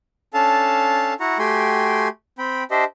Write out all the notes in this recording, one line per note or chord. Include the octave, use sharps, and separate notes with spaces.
C#4 D4 A4 F5 A5
E4 F#4 F#5 A#5
A3 F#4 G4 G5 G#5 C6
C4 G5 B5
D4 G4 C5 D#5 E5